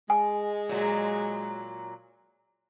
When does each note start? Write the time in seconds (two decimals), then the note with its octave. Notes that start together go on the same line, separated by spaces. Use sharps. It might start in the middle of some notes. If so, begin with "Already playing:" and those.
0.10 G#3 G#5
0.69 A#2 F#3